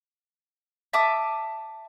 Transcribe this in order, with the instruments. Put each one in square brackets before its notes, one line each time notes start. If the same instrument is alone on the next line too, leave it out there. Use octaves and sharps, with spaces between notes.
[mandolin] E5 A5 D6 D#6